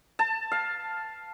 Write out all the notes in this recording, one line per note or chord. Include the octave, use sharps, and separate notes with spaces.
A5
F5